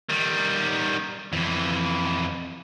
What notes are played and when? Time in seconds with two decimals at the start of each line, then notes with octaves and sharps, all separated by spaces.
0.09 D#3 G3
1.33 F2 E3